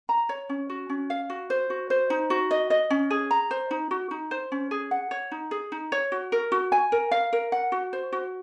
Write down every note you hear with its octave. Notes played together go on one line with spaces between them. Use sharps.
A#5
C#5
C#4
F#4
C#4
F5
F#4
C5
F#4
C5
D#4
F#4
D#5
D#5
C#4
G#4
A#5
C5
D#4
F#4
D#4
C5
C#4
G#4
F#5
C#5
D#4
G#4
D#4
C#5
F#4
A#4
F#4
G#5
A#4
F5
A#4
F#5
F#4
C5
F#4